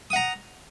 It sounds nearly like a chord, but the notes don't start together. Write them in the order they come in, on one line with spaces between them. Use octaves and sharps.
D#6 F#5 A#5